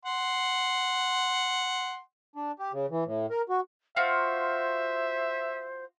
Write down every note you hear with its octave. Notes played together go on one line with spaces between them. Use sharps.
F#5 C6
D4
G4
C#3
E3
A2
A#4
F#4
F4 F#4 C5 E5